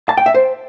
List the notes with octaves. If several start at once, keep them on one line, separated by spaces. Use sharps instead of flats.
A5
G5
E5
C5